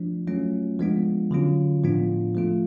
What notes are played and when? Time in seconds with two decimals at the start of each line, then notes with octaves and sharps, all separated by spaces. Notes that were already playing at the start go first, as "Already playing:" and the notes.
Already playing: F3 A3 D4
0.27 F#3 A3 C#4 F4
0.79 F3 G#3 B3 D4 F4
1.31 D3 F#3 C#4 F4
1.84 A2 F3 B3 D4 F4
2.35 F3 A3 F4